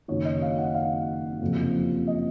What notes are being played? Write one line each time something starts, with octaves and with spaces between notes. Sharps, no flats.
F#1 F#2 D#3 F#3 C#5
D#5
F5
F#5
F5
F#1 F2 C3 F3
D#5